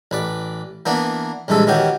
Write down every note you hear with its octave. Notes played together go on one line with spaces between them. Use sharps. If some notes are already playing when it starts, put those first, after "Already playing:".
A1 B4 D5
E3 A#3 B3 D4
A#1 G2 E3 G#3 A4
D#3 E3 C#4 F#4 G4